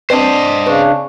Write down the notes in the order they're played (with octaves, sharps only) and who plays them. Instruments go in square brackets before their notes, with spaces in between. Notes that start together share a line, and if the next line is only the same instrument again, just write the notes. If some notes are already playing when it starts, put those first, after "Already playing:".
[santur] C4 D4 [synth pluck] B4 D5 [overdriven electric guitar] C5 D#5
[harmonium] C#3 D4 [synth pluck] B4 [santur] C#6